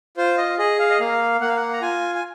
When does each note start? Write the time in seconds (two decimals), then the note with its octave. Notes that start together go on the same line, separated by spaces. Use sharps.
0.17 F4 C5
0.38 D#5
0.58 G#4 D#5
0.79 F5
0.90 D#5
0.99 A#3 F5
1.41 A#3 F#5
1.49 F5
1.56 F#5
1.73 A#5
1.82 F4 G#5
2.15 G#5